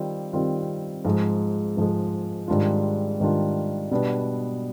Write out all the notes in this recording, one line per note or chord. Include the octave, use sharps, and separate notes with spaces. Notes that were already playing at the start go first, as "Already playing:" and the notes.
Already playing: D#3 G3 C4 F4
D#3 G3 C4 F4
G#2 F3 G#3
G#2 F3 G#3
G#2 D#3 G3 D4 F4
G#2 D#3 G3 D4 F4
B2 G3 B3 D4